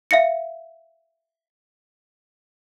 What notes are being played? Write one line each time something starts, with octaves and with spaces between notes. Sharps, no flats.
E5 F5 A#6 C#7